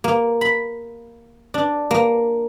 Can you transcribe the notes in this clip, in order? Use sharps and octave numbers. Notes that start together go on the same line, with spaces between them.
A#3
B5
D4
A#3